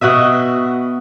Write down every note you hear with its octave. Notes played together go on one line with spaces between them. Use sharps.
B2 F#4 D#5 E5